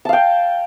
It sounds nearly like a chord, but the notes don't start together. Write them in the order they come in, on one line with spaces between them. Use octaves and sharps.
A5 F5 G5